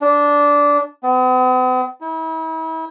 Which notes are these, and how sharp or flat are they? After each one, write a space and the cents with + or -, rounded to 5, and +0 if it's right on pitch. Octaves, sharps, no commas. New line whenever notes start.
D4 -15
B3 +45
E4 -40